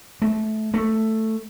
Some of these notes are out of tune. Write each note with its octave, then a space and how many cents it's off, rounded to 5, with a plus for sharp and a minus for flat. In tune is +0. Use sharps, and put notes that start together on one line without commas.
A3 -20
A3 +5